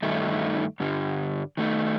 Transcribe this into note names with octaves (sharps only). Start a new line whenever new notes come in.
G2 D#3 A3 D#4
G2 D3 G3
D#3 A3 D#4